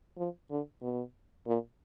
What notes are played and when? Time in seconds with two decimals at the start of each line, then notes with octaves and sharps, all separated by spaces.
0.18 F3
0.50 D3
0.82 B2
1.47 A#2